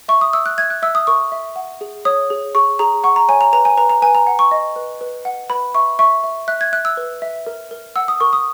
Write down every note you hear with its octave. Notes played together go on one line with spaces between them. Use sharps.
E5 C#6
D#6
E5 E6
F#6
E5 G#6
F#6
E5 E6
D#6
A#4 C#6
E5
F#5
G#4
C#5 D#6
G#4
G#4 C#6
G#4 A#5
F#5 C#6
A#5
C#5 G#5
A#5
B4 A#5
G#5
B4 A#5
A#5
B4 G#5
A#5
F#5
C#6
D#5
B4
B4
F#5
B4 B5
E5 C#6
E5 C#6
E5
E5 F#6
G#6
E5 F#6
E6
B4
E5
A#4
A#4
F#5 E6
D#6
A#4 C#6
D#6